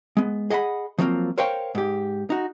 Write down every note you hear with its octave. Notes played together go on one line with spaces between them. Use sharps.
G#3 B3
G#4 D#5 F#5 A5 B5
F3 F#3 A#3 C4 F4
A#4 C5 C#5 F5 G5
G#2 G4
D#4 F#4